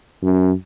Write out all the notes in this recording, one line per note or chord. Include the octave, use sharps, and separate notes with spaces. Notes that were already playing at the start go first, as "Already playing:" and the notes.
F#2